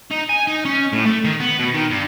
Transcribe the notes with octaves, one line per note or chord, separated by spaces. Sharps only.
D#4
G#5
D#4
C#4
A2
A3
D#3
B3
B2
D#3
G2